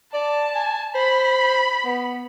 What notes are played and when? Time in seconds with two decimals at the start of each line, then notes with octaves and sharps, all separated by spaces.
0.14 D5 A5
0.55 G#5
0.95 C5 B5
1.85 B3